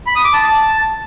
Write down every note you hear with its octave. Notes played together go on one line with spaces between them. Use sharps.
B5
D#6
D6
A5